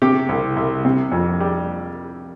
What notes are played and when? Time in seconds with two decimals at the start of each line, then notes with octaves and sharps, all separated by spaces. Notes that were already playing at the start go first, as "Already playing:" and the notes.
0.02 C3 G4
0.29 C2
0.56 C2
0.85 C3
1.12 F2
1.40 G3